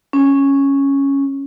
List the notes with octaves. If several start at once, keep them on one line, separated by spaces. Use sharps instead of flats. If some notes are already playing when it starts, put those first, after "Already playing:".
C#4